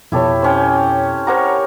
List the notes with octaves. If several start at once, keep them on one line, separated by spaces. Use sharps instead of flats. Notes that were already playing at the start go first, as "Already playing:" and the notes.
F2 B2 E4 G4 A4 C#5
C4 C#4 G5
G4 A#4 C5 C#5 F#5 A#5